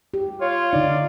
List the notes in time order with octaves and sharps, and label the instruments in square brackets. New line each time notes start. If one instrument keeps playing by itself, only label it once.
[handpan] G4
[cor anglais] F4 [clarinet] C#5
[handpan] D3 D#4 [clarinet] D5